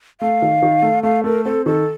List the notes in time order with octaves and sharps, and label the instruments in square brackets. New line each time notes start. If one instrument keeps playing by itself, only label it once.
[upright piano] A3 [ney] F5
[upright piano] D#3
D#3
A3
[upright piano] A3 [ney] F5
[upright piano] A3 [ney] A#4
[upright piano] C4 [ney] A4
[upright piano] D#3 [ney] A4